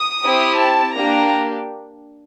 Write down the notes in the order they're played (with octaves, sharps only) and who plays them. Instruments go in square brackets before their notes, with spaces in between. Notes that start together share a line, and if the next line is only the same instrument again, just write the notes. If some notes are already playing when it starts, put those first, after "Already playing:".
Already playing: [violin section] D#6
C4 E4 G4
A5
A#3 D4 G4 A#5